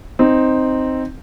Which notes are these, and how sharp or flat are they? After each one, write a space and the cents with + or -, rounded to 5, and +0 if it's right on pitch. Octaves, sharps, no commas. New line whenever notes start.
C4 +0 D#4 +0